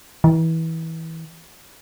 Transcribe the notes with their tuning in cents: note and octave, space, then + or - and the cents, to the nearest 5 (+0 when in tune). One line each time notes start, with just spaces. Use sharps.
E3 -25